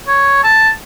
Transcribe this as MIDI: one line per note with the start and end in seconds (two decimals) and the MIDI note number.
0.08 0.41 73
0.44 0.69 81